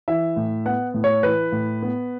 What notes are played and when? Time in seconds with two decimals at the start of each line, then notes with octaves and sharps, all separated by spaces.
0.08 E3 E5
0.36 A2
0.65 B3 F#5
0.94 A2
1.04 C#5
1.23 E3 B4
1.52 A2
1.82 B3